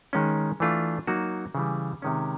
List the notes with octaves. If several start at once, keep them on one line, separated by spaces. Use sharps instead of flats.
D#3 G#3 C#4
E3 A3 D4 F4
F#3 A#3 D#4 F#4
C#3 E3 G3
C3 D#3 G#3 C#4